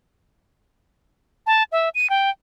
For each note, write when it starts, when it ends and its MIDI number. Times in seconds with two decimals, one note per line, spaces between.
1.47 1.63 81
1.72 1.89 76
1.95 2.09 99
2.10 2.30 79